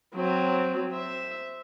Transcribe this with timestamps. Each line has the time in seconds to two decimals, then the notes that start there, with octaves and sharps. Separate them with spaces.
0.15 F#3 C4
0.92 C5 E5